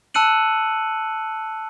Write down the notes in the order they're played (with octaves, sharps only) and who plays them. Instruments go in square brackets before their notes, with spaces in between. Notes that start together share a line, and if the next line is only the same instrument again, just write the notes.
[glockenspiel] A5 E6 F#6 C#7 D#7 F#7